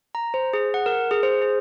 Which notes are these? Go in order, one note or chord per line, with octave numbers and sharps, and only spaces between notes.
A#5
C5
G#4
F#5
A#4
G#4
C5
G#4